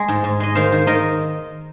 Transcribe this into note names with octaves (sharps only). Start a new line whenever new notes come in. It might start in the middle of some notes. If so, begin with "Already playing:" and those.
Already playing: G#3 G#4
G#2
G#2
G#3 D#5
D#3 C5 F5
D#3
D#3 A#4 D#5